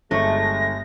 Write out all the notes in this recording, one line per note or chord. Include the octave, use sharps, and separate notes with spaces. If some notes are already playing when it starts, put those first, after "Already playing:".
G1 G#3 A3 A#6